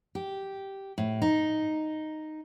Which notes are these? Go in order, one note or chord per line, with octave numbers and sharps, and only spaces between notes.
G4
A2
D#4